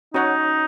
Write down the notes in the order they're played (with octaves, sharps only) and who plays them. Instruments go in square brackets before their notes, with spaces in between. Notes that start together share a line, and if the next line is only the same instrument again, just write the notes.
[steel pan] C#4 F#4 C#5 F#5 [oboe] D#4